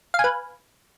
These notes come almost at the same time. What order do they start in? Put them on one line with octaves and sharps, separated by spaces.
F5 G#5 B4